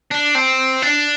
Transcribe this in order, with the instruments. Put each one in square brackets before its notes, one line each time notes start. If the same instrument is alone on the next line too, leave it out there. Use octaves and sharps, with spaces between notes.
[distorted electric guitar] D4
C4
D4